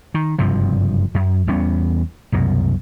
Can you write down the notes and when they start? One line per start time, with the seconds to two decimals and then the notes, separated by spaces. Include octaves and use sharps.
0.14 D#3
0.39 F#1 G2 C3 F3
1.15 F#2
1.47 E2 G3 B3 C#4
2.32 C2 F#2 B2